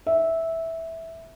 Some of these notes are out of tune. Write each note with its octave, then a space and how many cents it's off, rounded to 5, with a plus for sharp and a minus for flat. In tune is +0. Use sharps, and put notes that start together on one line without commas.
E5 -10